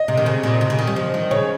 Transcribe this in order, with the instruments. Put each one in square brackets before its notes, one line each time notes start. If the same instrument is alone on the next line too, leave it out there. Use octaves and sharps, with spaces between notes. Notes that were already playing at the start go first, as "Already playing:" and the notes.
Already playing: [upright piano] D#5
[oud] C3
D#3
C#3
A#2
C3
C#3
D#3
G3
F3
D#3
[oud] C#3 [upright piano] C#5